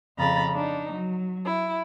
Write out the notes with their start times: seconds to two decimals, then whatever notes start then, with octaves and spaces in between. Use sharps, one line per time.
0.18 F2 C#3 A#5 B5 A6
0.54 D4 D#4
0.91 F#3
1.45 E4